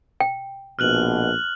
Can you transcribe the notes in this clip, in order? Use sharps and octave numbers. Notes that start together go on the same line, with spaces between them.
G5
A#1 B2 F6 F#6 F#7